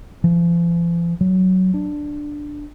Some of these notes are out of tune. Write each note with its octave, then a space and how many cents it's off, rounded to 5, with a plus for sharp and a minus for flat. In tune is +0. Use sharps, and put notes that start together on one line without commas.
F3 -45
F#3 +10
D4 +5